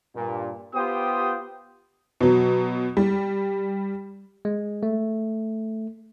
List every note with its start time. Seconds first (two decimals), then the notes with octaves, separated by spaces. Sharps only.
0.16 G2 A#2
0.75 B3 F4 G4 C5 G5 D#6
2.21 B2 F#3
2.97 G3
4.45 G#3
4.83 A3